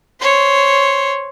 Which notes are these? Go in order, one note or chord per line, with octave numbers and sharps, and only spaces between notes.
C5 C#5